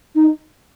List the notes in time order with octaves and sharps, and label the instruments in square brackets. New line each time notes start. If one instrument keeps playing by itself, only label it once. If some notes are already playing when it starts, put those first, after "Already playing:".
[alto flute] D#4